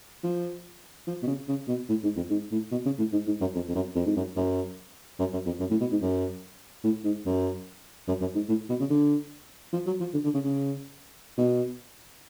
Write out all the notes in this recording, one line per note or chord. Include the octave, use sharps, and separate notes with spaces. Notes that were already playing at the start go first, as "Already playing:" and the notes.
F3
F3
B2
C#3
C#3
B2
A2
G#2
F2
G#2
A2
B2
C#3
A2
G#2
G#2
F#2
F2
F2
F#2
F2
G#2
F#2
F#2
F#2
F#2
F2
F#2
A2
B2
G#2
F#2
A2
G#2
F#2
F#2
F#2
G#2
A2
B2
C#3
D3
F3
F#3
F3
D3
D3
C#3
C#3
B2